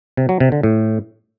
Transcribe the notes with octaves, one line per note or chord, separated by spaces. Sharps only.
C3
F#3
C3
D3
A2